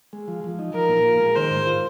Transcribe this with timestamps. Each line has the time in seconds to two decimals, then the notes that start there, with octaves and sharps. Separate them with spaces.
0.13 G#3
0.28 F3
0.44 F3
0.59 D#4
0.74 F3 A#4
0.89 A#2
1.05 F4
1.20 G#3
1.35 D#3 C5
1.50 G#2
1.67 F4